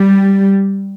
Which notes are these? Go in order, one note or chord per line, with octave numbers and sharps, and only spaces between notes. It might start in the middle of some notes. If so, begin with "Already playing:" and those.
Already playing: G3